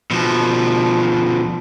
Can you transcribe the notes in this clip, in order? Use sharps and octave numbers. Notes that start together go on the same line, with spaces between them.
B2 F3